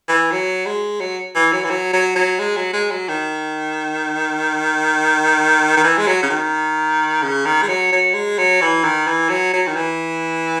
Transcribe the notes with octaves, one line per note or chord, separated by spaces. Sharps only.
E3
F#3
G#3
F#3
E3
F#3
E3
F#3
F#3
F#3
G#3
F#3
G#3
F#3
D#3
D#3
E3
G#3
F#3
C#3
D#3
C#3
D#3
G#3
F#3
F#3
G#3
F#3
E3
D#3
E3
F#3
F#3
D#3
E3